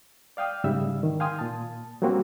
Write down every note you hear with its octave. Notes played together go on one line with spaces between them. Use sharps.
D5 F5 G5 D#6
G#2 C#3 G3 E5 E6
D#3
F5 G5 G#5 C6 D#6
A#2 A5
F#3 G3 A#3 C4 C#4 F#4